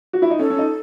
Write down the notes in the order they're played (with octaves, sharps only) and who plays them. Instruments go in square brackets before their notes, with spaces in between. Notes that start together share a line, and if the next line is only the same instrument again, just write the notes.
[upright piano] F#4
E4
D#4
[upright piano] C#4 [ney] A4
[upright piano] C#4
D#4